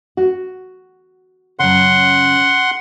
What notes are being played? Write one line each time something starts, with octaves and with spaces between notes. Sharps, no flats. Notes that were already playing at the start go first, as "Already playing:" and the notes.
F#4
F#2 C#3 F#5 C6